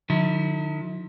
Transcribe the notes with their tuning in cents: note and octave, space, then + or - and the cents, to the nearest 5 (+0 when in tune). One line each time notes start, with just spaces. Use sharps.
D3 +45 F#3 -45 E4 -30